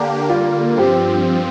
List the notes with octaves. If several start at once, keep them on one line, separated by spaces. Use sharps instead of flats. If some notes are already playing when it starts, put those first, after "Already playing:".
Already playing: D3 A#3 D4 G4
D3 G3 A#3 F4
G2 F3 C4 G4 C5